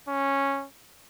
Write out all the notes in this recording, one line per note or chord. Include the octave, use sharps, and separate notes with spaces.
C#4